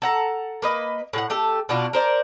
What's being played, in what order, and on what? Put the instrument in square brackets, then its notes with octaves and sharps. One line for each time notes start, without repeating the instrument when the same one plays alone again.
[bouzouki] A4 F#5 A#5
A#3 B4 D#5
A2 G4 F#5
A3 G4 A4
B2 B3 D4 F4
A#4 C5 D5